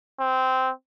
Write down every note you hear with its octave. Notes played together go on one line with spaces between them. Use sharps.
C4